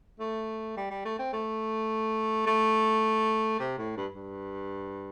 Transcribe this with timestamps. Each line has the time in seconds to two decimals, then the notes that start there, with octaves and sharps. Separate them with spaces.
0.19 A3
0.76 G3
0.90 G3
1.05 A3
1.19 C4
1.33 A3
2.46 A3
3.59 C3
3.78 A2
3.97 G2
4.14 G2